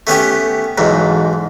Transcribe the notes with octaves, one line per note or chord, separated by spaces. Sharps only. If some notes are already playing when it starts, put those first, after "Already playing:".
A3 B3 C#4 G4
B1 E2 G#2